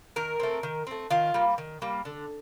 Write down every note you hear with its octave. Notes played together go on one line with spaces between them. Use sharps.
D#3 A#4
A3 C4
D#3
A3 C4
D#3 F4
G3 A#3
D#3
G3 A#3
D3